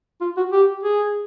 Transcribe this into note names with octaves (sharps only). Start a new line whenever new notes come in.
F4
F#4
G4
G#4